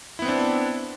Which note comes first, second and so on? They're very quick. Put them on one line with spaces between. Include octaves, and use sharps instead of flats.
E4 B3 C4 D4